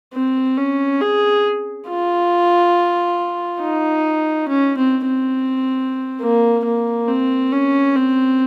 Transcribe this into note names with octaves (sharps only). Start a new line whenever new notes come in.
C4
C#4
G#4
F4
D#4
C#4
C4
C4
A#3
A#3
C4
C#4
C4